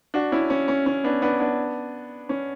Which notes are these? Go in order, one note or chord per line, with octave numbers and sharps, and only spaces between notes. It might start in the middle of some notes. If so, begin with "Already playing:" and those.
D4 F#4
C#4 E4
C#4
C#4
C#4
B3 D4
B3 D4
B3 D4
C#4